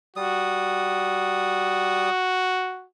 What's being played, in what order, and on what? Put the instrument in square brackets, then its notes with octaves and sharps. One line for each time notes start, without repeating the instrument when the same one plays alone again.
[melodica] G3 D#6 [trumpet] F#4